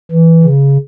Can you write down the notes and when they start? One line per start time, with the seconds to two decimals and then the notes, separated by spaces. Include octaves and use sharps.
0.11 E3
0.43 C#3